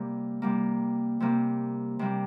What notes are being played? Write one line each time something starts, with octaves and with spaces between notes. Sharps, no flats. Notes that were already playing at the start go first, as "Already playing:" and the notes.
Already playing: C3 G3 A#3
C3 G3 A#3
C3 G3 A#3
C3 G3 A#3